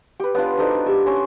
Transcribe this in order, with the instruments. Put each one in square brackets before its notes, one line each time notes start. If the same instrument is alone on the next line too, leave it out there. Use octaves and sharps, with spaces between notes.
[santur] G4 B4 [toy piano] G5
[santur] B3 D4 F4 [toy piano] C#5 G#5
[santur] D4 D#4 D5 [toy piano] F#4 A4 C5
[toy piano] D6
[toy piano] G4 G#4 [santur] E5
[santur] C#4 C5 C#5 [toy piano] D6